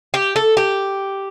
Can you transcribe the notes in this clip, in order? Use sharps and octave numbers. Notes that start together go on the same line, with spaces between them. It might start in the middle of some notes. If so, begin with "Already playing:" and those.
G4
A4
G4